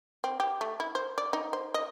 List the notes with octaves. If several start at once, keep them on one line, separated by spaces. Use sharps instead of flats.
C4
G4
A3
E4
C5
D5
D#4
C5
D#5